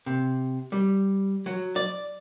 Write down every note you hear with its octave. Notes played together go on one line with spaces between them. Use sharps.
C3
G3
F#3
D5